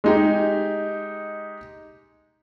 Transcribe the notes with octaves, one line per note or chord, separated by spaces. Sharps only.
G#3 D#4 G4